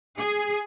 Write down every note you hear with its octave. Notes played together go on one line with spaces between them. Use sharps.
G#4